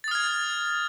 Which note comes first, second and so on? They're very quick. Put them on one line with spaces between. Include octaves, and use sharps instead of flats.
A6 D#6 F6 G#6